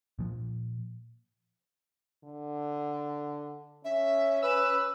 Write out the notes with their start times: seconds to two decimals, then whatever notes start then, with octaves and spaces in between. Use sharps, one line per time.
0.19 A#2 F3
2.24 D3
3.84 C#4 E5
4.42 B4 E6